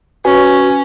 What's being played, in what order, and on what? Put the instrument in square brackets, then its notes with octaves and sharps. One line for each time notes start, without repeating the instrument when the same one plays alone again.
[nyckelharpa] C#4 [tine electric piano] F#4 B4 G#5